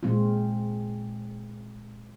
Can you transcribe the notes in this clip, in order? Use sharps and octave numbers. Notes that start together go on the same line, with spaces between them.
A#2 G#3 C4 F4